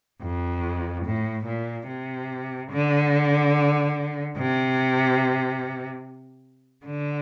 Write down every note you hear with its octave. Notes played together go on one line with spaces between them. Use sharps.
F2
A2
A#2
C3
D3
C3
D3